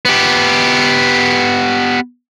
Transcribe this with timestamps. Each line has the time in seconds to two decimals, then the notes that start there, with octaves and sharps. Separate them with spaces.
0.05 B3 G4